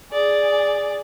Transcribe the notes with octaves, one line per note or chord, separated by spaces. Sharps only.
G#4 D5